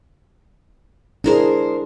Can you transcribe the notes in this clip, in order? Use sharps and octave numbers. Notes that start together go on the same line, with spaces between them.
G#3 D4 E4 G#4 A#4 C5